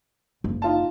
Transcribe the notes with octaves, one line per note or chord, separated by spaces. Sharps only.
F#1
D#4 F4 A5